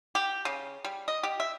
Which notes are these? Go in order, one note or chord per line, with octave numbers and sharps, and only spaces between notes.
G4
C#3
G3
D#5
G4
E5